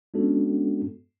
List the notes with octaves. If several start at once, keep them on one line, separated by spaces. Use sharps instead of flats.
G#3 B3 C#4 D4 F#4 A4